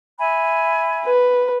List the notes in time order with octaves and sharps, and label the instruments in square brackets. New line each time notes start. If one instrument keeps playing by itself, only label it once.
[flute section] E5 G#5 B5
[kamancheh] B4